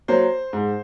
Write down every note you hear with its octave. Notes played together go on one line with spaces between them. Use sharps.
F#3 A#3 C5
G#2